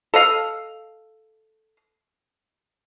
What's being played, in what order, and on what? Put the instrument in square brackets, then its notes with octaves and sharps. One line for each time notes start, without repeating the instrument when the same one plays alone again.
[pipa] A4 D#5 F5